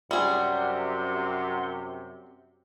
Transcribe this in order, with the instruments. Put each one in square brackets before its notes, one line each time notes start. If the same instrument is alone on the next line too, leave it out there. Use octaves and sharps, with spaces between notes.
[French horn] F#2 [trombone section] C3 [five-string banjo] G3 G#4 [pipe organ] F#5 C6